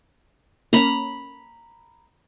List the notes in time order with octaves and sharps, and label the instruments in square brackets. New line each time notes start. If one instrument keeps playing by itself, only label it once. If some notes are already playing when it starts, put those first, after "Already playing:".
[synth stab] A#3 C#4 [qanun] A#5 B5